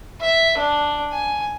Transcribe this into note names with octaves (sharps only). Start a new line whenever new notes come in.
E5
D4
G#5